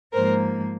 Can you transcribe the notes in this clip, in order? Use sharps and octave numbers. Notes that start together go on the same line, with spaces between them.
G#2 F3 A#3 A#4 C5